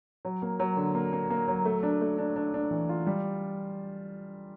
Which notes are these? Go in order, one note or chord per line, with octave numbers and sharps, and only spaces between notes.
F#3
A#3
F#3
D3
A#3
A#3
A#3
F#3
A3
D4
A3
D4
D4
D4
E3
F4
G3